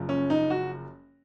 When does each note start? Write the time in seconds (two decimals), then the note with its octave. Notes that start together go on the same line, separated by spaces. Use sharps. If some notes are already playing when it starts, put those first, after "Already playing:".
Already playing: F#1 F#2 F3
0.09 C#4
0.30 D#4
0.50 F#4